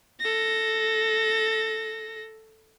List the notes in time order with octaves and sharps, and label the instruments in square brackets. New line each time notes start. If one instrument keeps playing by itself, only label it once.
[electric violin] A4 A#6